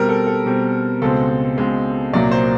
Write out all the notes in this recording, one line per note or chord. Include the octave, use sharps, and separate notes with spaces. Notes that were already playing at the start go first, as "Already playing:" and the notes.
Already playing: B2 G3 C4 A#4
A4
A4
B2 G3 C4
C#2 B2 G#3 C4 A4
C#2 B2 G#3 C4
C2 A#2 F#3 A#3 D5
C5